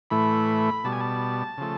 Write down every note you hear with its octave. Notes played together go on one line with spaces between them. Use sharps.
A2 E3 A3 B5
B2 G3 A5
G#5
A5
C#3 F3 A3